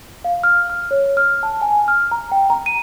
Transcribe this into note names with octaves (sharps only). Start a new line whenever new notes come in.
F5
F6
F6
C#5
F6
A5
G#5
F6
A#5
G5
A#5
D#7